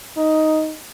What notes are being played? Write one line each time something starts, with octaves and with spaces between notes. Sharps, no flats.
D#4